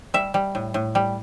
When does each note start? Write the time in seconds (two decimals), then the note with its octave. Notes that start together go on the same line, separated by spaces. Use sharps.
0.14 G3 E5
0.34 G3
0.55 A2
0.74 A2
0.95 G3